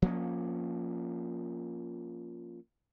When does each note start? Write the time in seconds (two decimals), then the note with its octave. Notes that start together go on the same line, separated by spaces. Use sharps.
0.02 F3 A#3 C#4